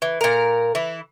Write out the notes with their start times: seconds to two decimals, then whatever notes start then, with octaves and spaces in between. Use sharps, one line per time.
0.02 E3
0.21 A#2 A#4
0.75 E3 E4